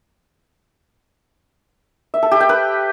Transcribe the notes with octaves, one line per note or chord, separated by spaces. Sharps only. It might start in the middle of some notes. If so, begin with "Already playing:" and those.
E5
A4
G4
G5
B4